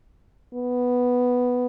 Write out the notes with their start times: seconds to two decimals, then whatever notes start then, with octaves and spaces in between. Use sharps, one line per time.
0.54 B3